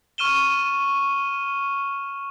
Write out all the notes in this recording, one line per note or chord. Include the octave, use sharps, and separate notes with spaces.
C#6 F6 D#7 E7 G7